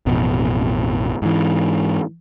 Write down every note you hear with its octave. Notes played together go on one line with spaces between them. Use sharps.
A1 F2 B2
G#2 E3